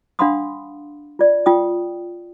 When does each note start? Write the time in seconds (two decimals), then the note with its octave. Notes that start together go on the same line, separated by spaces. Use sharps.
0.19 D4 F5 F#5 B5 C6 D#6
1.19 F4 D5
1.46 F4 G5 D#6